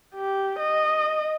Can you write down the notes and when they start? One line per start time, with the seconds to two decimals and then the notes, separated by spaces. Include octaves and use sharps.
0.15 G4
0.59 D#5